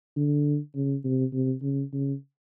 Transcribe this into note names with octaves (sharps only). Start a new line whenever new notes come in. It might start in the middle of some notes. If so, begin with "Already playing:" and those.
D3
C#3
C3
C3
C#3
C#3